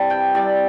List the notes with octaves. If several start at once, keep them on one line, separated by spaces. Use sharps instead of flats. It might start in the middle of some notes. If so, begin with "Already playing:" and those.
Already playing: C3 E3 G3 A5
G5
C3 E3 G3 D5